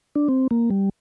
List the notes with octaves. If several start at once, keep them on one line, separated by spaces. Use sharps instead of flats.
D4
C4
A#3
G3